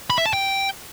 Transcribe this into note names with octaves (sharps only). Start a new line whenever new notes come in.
B5
E5
A5
G5